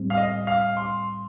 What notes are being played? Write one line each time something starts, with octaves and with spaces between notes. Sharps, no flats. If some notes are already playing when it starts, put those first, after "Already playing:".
Already playing: A2 G3 C4
F5
D#5
F5
C6